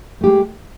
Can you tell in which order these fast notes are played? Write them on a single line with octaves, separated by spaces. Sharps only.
A3 G4 G#3